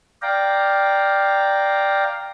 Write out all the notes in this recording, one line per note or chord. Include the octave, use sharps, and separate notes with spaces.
D5 F5 G5 A#5